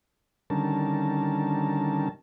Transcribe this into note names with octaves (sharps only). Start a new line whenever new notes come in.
D3 D#3 G3 C#4 A#4 A5